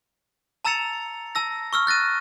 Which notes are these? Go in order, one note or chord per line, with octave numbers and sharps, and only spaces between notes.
A5 A#5 E6 A6 C#7 F7
A5 E6 A#6
C#6 E6 F6
F#6 A6 A#6 D#7